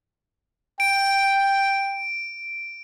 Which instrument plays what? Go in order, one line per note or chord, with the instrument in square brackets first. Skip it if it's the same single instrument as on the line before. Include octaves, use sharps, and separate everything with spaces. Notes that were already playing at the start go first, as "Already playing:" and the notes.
[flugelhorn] G5 [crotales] D7